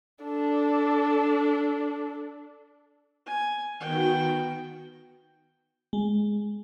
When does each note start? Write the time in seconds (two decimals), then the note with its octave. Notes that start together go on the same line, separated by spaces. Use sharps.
0.24 D4 A4
3.26 G#5
3.80 D#3 B3 F#4 G5
5.93 G#3